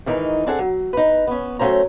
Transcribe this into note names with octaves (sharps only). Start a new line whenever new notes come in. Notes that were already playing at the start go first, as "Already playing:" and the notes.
G#2 D#3 E3 D#4
C4 D4 G#4 A4 F#5
F#3
D#4 B4
B3 C#4
F#3 A3 C#4 C5 A#5